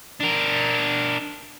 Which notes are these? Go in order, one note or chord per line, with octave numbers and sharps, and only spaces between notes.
D4 A#4